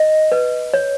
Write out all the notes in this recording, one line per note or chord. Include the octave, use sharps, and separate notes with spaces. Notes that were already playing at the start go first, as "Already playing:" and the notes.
Already playing: D#5
B4
C#5